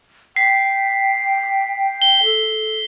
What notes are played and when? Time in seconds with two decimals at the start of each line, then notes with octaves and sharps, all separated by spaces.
0.36 G5 B6 C7
2.02 G7
2.24 A4